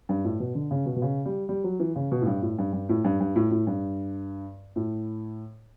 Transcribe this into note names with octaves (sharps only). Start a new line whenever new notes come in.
G2
A2
B2
D3
C#3
B2
B2
C#3
G3
G3
F#3
E3
C#3
B2
A2
G2
A2
G2
G2
A2
G2
G2
A2
A2
G2
A2